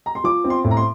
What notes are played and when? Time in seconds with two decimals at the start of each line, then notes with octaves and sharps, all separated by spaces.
0.06 A#5
0.15 C6
0.24 F3 D6
0.44 C4
0.50 C6
0.64 A2
0.71 A#5
0.77 C6